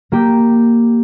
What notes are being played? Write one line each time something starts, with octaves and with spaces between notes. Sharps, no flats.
A#3 G4